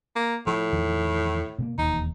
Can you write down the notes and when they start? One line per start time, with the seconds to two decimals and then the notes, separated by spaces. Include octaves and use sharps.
0.16 A#3
0.47 A2 F3
0.73 E2 D#3 F3
1.58 B2 G#3 A#3
1.78 E1 D#2 D#4